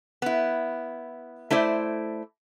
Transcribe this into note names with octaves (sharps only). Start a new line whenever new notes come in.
B3 E4
A3 E4 C5 D5